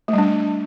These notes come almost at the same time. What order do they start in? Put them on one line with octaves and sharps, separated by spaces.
A3 G3 D4